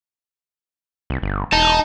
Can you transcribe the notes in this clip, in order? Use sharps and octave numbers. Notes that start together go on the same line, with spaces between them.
C2
G1
E1 D#4 A5